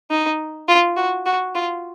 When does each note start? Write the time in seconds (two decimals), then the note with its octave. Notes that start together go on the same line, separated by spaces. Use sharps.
0.11 D#4
0.68 F4
0.97 F#4
1.26 F#4
1.55 F4